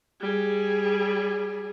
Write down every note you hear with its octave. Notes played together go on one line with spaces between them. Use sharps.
G3 G#4